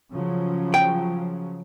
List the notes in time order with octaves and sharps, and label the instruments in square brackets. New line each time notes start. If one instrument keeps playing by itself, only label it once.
[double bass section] C#3 F3 F#3
[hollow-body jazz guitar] G5